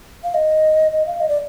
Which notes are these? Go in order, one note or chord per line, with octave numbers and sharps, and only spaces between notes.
F5
D#5
D#5
F5
D#5
D5